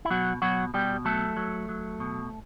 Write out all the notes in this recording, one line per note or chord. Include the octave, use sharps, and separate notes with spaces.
E4
B2 F#3 F#4
B2 F#3 F#4
B2 G3 G4
F#3 A3 A4
F#3
F#3
B2